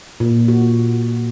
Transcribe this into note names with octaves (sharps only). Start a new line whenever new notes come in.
A#2
F#4